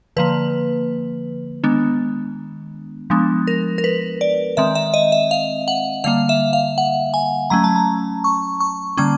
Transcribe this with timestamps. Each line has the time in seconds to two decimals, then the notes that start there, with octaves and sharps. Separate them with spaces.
0.17 D3 F3 A#3 B4
1.64 D#3 G#3 B3 D4
3.10 F3 G#3 B3 D4
3.47 A#4
3.78 A#4
3.84 B4
4.21 D5
4.57 D#3 G#3 C4 E5
4.75 E5
4.94 D#5
5.12 E5
5.31 F5
5.68 F#5
6.04 D3 G3 A#3 F5
6.29 E5
6.53 F5
6.78 F#5
7.14 G#5
7.50 F#3 A3 C#4 A#5
7.64 A5
7.76 A#5
8.24 C#6
8.60 C#6
8.97 D3 G3 A#3 C#4 D6